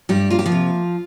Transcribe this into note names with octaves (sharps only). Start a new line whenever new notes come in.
G2 G3 G4
A#3 F4
G4
F3 F4
C3